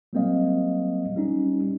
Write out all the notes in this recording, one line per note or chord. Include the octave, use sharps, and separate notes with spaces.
F#3 G3 A#3 C4 D#5 F5
G3 C#4 D#4